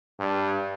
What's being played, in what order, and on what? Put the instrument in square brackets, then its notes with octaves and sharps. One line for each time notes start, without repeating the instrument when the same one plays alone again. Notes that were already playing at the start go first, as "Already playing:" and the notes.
[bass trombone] G2